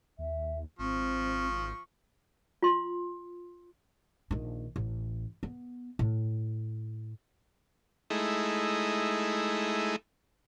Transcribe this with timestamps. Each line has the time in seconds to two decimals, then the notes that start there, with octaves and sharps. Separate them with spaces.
0.19 D#2 E5
0.79 G#1 F3 C4 C#6
2.62 F4 C6
4.31 A#1 D#3
4.76 A1
5.43 B3
5.99 A2
8.10 G#3 A3 D#4 E4